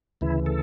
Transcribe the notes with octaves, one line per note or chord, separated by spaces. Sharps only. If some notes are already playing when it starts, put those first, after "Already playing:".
D2 C#3 E3 E4
A4